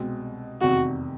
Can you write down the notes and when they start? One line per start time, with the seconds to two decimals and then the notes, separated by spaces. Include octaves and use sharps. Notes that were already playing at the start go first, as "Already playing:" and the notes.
Already playing: C2 B2 G#3 C4
0.61 F1 E2 C3 D#3 F#4